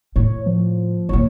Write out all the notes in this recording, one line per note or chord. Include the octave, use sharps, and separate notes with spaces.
A2 C#5
F3
E2 A#2 C#5